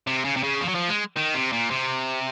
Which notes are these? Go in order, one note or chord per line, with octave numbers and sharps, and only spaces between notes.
C3
C#3
C3
C#3
F3
F#3
F3
G#3
D#3
C3
A#2
C3